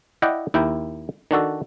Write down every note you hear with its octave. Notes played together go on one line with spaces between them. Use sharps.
E4 D5 D#5 F#5 G5
D#2 E4 A#4 G5
D#3 D4 F#4 A4